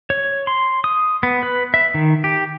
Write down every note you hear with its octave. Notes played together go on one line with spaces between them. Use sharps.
C#5
C6
D#6
B3
B4
E5
D#3
G4